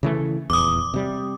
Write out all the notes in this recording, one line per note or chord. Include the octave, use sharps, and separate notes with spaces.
C#3 E3 A3
D#1 E2 D6 D#6
C3 G3